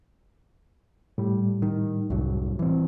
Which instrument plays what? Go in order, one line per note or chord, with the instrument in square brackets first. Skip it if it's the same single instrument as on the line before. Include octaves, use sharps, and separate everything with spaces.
[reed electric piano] A2 G3
[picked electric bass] D#3
C2 F#2 F#3
E3 C4